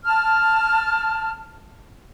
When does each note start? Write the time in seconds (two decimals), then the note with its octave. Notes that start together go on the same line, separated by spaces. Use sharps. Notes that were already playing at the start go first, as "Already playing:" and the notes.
0.04 A5 F6